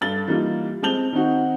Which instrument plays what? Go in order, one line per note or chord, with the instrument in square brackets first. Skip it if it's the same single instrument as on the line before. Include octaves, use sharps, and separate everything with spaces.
[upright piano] G2 A4 A6 G7
E3 G3 A#3 D#4 F4
G#3 C4 A5 G6 F7 G7
D#3 C4 D#4 F#4